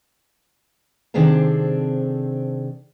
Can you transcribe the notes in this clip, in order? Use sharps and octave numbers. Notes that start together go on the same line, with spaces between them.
C3 D#3 C4 D4 G#4 A4